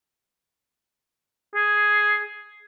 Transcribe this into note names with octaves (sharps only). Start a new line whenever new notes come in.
G#4